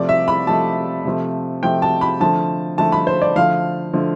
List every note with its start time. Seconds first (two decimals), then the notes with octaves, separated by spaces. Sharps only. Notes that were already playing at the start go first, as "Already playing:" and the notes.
Already playing: C3 F3 A3 D5
0.09 E5
0.28 B5
0.47 C3 F3 A3 A5
1.05 C3 F3 A3
1.63 C3 F3 A3 G5
1.82 A5
2.01 B5
2.20 D3 F3 A3 A5
2.78 D3 F3 A3 A5
2.92 B5
3.07 C5
3.22 D5
3.36 D3 F3 A3 F5
3.93 D3 F3 A3